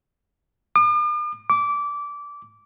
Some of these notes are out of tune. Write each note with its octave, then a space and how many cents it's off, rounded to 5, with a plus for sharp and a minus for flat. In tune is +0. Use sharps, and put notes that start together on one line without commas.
D6 +45
D6 -20